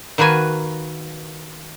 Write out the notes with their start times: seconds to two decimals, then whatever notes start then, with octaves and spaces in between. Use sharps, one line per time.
0.18 D#3 A#3 F#4 B4 G#5